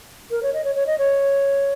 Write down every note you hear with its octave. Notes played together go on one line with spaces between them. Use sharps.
A#4
C#5
D#5
C#5
C#5
D#5
C#5